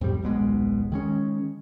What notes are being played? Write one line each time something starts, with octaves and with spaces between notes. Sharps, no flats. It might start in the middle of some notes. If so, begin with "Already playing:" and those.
F2 A2 C3 G3
D#1 B1 B2 G#3
D#3 G#3 C#4